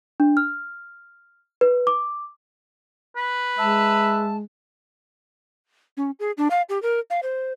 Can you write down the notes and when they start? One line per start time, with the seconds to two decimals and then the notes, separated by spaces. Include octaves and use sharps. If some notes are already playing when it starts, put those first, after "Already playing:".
0.20 D4
0.37 F6
1.61 B4
1.87 D6
3.17 B4
3.58 G#3 E5 A5
5.97 C#4
6.19 G#4
6.38 D4
6.51 F5
6.69 G4
6.82 A#4
7.10 F5
7.23 C5